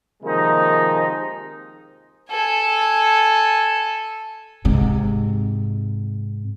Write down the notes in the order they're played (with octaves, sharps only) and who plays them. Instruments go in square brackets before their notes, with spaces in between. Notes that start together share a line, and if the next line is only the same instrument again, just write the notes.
[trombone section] C3 D#3 F3 G#3 A#3 D#4
[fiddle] A4 G#5
[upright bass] G#2 C3